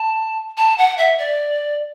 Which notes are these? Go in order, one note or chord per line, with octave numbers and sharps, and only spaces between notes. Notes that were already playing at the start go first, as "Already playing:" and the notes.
Already playing: A5
A5
F#5
E5
D5